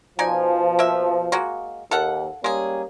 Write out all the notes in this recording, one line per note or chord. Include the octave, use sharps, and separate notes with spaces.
B2 F3 D#4 D5 G#5
A#3 E5
G#3 A#3 F#4
D#2 A4 F5 F#5
G3 G#3 A#3 C#4 G#4